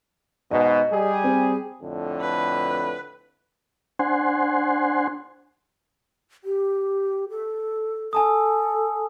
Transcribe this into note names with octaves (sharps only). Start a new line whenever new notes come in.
G#2 B2 D#5
G3 G#4
C4
F2 A2 D3
B4
D4 C5 F#5 G#5 C6
G4
A4
A4 G#5 A5 D#6